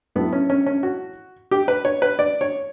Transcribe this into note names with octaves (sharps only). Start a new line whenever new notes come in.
A2 F#3 A3 B3
C#4
C#4
C#4
F#4
G4
B4
C#5
B4
D5
C#5